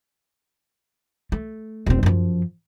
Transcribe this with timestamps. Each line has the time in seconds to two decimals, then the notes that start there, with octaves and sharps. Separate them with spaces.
1.32 A3
1.86 D#1 C4
2.03 F#2 F3